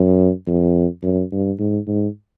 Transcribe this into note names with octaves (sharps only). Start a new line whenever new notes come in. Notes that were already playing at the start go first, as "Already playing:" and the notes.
Already playing: F#2
F2
F#2
G2
G#2
G#2